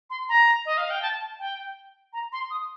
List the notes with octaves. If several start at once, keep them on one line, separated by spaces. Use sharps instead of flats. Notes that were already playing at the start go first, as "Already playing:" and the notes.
C6
A#5
D#5
F5
G5
A5
A5
G5
A#5
C6
D#6